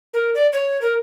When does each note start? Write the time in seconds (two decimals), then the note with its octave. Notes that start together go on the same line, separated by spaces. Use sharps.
0.14 A#4
0.35 D5
0.53 C#5
0.81 A#4